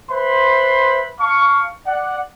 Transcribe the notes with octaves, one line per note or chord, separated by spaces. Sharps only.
B4 C5 E5 B5 C6
F5 A5 C#6
D5 F#5